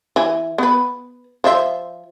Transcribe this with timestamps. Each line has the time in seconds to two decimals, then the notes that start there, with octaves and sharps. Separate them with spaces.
0.16 E3 E5 G#5
0.58 B3 B4
1.44 F3 C5 E5